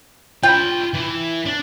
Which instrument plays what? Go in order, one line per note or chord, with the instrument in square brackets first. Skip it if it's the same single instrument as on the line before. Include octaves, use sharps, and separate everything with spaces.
[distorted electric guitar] F4 B5 [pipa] G5
[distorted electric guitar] E3
D4